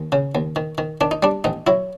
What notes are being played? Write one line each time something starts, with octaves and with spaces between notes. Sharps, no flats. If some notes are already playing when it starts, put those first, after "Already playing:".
Already playing: D#2
C#3
D#2
D#3
D#3
D#3 D4
D#4
G3 D4
A1 D#4
F#3 E4